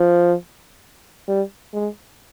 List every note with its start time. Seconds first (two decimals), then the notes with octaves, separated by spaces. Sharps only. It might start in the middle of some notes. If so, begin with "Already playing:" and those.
Already playing: F3
1.28 G3
1.74 G#3